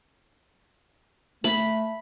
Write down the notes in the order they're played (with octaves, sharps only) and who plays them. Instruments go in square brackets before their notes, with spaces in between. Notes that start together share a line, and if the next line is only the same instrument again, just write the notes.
[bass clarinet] A3 [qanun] B5